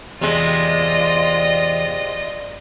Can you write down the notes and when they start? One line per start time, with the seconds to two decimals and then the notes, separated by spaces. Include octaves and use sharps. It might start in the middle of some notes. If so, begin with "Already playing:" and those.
0.21 E2 C3 G#3 F4 D5 D#5